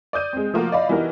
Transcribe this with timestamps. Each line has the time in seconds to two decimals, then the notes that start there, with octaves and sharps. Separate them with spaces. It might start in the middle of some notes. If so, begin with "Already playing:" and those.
0.13 D5 D#6 G6 D#7
0.33 G#3 C4
0.54 F3 A3 A#3 F4 F#4
0.72 D5 D#5 F5 B5
0.89 E3 G3 B3 D#4 F#4 A#4